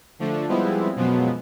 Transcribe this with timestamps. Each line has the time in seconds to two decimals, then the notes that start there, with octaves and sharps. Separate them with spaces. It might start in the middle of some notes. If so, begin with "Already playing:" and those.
0.19 D3 F3 A3 D4
0.48 F3 G3 G#3 B3 C4 E4
0.95 F#2 B2 F3 F#3 G#3 B3